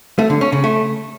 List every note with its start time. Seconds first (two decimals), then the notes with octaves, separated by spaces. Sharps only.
0.19 A3
0.30 D3
0.41 C#4
0.52 C#3
0.64 A3